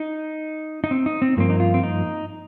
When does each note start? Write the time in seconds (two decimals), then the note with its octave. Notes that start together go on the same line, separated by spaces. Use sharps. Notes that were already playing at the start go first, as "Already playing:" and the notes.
Already playing: D#4
0.84 D#4
0.91 C4
1.06 D#4
1.22 C4
1.37 G2 F3 A#3 C4
1.50 D#4
1.60 F4
1.74 C4
1.83 D#4